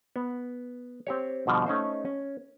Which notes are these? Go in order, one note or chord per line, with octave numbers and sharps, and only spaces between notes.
B3
C4 G4 C#5
B2 D3 F3 G3
A3 C#4 D#4 C5
C#4